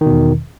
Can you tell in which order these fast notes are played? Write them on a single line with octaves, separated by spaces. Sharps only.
D#3 B2 E2